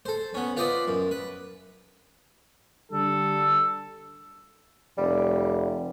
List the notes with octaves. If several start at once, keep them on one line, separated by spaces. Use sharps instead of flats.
A4 C5
B3 C#4
F4 B4 C5 D5 D#5 B5
F#2
B4
D3 G3 A4
F1 G3